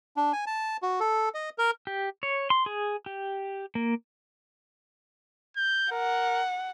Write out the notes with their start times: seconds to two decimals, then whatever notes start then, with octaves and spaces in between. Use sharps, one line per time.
0.17 D4
0.33 G#5
0.46 A5
0.82 F#4
1.00 A4
1.34 D#5
1.58 A#4
1.87 G4
2.23 C#5
2.50 C6
2.66 G#4
3.06 G4
3.75 A#3
5.57 G6
5.92 A#4 F#5